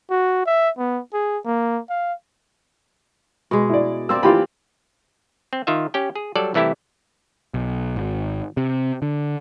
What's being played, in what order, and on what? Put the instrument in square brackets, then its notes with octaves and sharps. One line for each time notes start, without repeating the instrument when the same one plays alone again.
[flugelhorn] F#4
E5
B3
G#4
A#3
F5
[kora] B2 G#3
[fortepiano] E4 D5
[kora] A#3 C4 D5 [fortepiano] E6
[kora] E3 [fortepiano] F4 G4 B5
[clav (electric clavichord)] C4
D#3 F4 E5
C#4 G4 G5
G#4
F#3 G3 A4 D5
C2 E3 A3 E4 G4
[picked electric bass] B1
G#1
C3
D3